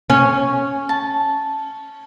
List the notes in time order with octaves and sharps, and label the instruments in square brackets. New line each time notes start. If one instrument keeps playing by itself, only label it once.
[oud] C#4 [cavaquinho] G#5
[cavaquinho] A5